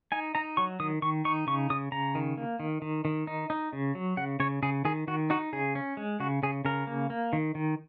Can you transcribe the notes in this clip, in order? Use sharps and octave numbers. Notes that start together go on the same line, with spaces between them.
D#4 G#5
D#4 A#5
F#3 C#6
D#3 D#6
D#3 C#6
D#4 C#6
C#3 C#6
C#3 D#6
C#3 A#5
D#3
A#3
D#3
D#3
D#3
D#4
D#4
C#3
F#3
C#3 F#5
C#3 C#5
C#3 G#4
D#3 G#4
D#3 F#4
D#4 F#4
C#3 G#4
C#4
G#3
C#3 F#4
C#3 G#4
C#3 A#4
A#3
A#3
D#3
D#3